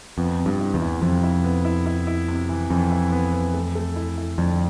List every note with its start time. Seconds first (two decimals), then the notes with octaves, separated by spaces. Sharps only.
0.18 F2 B3
0.39 C3
0.46 G2
0.60 E4
0.74 E2
0.82 E4
1.02 F2 C3
1.23 E4
1.44 B3
1.65 E4
1.86 E4
2.07 E4
2.28 C3
2.49 E3
2.70 F2 E3
2.92 E4
3.12 B3
3.33 B3
3.54 A3
3.75 A3
3.96 E4
4.17 E4
4.38 F2 D3